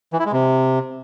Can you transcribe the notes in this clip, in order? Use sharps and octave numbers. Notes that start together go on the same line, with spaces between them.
E3
E4
G#3
C3